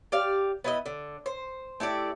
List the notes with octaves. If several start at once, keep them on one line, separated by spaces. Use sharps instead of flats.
G4 D5 F5
B3 E4 D#5
D3
C5
A3 E4 G4 D5